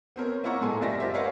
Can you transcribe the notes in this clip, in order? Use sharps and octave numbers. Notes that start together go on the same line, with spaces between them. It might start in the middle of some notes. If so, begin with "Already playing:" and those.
B3 C4 A#4 C#5
A#3 E4 F4 F#5 A#5 C#6
A#2 G#3 A4 G#5 A#5
F#1 F4 G4 D5 E5 A#6
F4 G4 C5 E5
A#4 B4 C#5 D5 F5 F#5